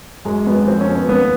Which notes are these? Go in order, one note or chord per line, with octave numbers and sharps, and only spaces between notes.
F#2 G#3
G#1 B3
F2 C4
C#4
F#1
B3
D#2 B3